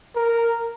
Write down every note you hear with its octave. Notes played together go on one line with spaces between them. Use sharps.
A#4